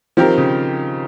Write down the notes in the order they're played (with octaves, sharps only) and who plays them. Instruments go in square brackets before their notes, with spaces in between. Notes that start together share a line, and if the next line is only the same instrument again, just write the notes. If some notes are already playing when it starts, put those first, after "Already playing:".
[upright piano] D#3 [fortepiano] F3 C4 G4 A#4
[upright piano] C#3